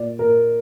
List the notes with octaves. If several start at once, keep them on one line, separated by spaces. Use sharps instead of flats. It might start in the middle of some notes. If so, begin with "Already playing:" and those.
Already playing: A#2 D5
A#2 A#4